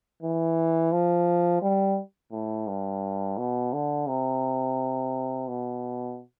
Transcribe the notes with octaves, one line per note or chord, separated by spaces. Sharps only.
E3
F3
G3
A2
G2
B2
D3
C3
B2